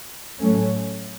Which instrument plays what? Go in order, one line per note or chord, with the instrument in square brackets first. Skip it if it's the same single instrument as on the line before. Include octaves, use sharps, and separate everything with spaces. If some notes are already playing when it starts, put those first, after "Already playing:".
[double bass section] A2 F#3 A3 C#4